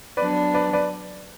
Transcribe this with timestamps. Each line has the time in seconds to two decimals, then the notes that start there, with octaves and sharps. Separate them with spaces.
0.17 F#3 B3 D4 B4 D5
0.54 B4 D5
0.73 B4 D5